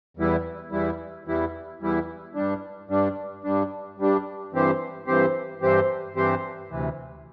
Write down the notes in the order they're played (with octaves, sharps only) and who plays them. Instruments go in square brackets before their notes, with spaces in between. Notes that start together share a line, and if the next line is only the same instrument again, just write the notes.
[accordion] E2 E3 G3 E4
E2 E3 G3 E4
E2 E3 G3 E4
E2 E3 G3 E4
G2 G3 D4
G2 G3 D4
G2 G3 D4
G2 G3 D4
G2 E3 C4 G4 C5
G2 E3 C4 G4 C5
G2 E3 C4 G4 C5
G2 E3 C4 G4 C5
D2 C3 E3